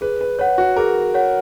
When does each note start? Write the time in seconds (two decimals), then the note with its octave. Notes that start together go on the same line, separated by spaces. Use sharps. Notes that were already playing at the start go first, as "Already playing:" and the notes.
0.01 G#4 B4
0.21 B4
0.39 B4 C#5 F#5
0.58 F#4
0.76 G#4 A#4
1.15 C#5 F#5